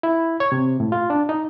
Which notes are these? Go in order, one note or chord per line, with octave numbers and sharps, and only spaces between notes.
E4
C#5
C3
A2
F4
D4
D#4